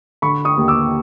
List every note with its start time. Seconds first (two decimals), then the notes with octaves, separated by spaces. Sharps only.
0.22 D3 B5 C#6
0.45 C#6 D#6
0.57 D#2
0.68 D6 E6